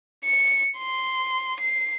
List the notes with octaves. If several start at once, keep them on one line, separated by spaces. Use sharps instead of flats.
C#7
C6
C7